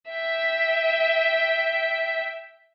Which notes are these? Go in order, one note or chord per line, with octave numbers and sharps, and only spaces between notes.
E5 G5